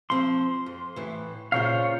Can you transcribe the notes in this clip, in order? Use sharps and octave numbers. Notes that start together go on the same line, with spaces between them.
F3 C4 C6
F2
A2 E3
A#2 C#3 F4 C5 C#5 F5